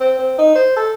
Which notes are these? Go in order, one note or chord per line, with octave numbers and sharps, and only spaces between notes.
C4
C4
D#4
C5
A4